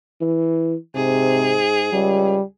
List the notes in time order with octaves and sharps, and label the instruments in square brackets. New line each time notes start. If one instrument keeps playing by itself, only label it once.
[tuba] E3
[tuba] G#2 [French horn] C3 [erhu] G#4
[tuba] C#2 [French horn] G3